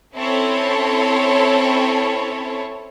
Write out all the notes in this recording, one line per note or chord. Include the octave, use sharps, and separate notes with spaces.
C4 C#4 E4 A4 C#5